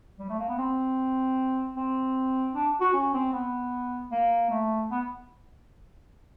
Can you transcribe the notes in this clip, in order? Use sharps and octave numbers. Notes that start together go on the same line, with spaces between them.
G3
A3
A#3
B3
C4
C4
D4
F#4
C#4
C4
B3
A#3
A3
B3